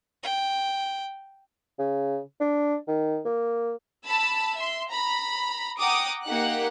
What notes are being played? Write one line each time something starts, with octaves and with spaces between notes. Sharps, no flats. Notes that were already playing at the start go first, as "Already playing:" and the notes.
G5
C#3
D4
D#3
A#3
A5 B5 E6
E5 C6
A#5 B5
F#5 G5 A#5 D6 D#6
A#3 D#4 G4 F#5 F#6